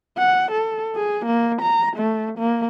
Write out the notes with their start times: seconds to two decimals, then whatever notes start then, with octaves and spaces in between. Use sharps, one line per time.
0.17 F#5
0.51 A4
0.95 G#4
1.25 A#3
1.62 A#5
1.97 A3
2.38 A#3